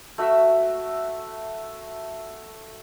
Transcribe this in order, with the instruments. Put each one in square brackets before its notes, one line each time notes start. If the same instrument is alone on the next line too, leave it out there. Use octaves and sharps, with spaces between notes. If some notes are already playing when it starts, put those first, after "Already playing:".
[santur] A3 F#4 E5